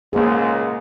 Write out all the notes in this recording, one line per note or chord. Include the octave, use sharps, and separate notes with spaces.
C#2 G#2 A#3 G#4